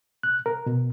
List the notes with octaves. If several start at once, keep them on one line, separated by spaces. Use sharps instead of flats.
F#6
A#4
B2